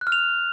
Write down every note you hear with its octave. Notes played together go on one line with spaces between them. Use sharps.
F#6
F6
F7